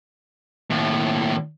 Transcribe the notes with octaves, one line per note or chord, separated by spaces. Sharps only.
D#2 A2